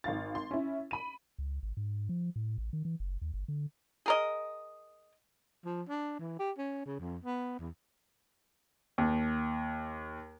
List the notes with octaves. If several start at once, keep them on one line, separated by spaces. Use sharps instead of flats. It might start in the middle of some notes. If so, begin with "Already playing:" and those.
G#1 F5 A6
C6
C#4 E4
B5 D#7
C#2
G#1
G#2
F3
A2
A1
D#3
E3
F#1
D#2
G1
D3
G#4 A#4 D#5
F3
D4
E3
G4
C#4
C#3
F2
B3
E2
D#2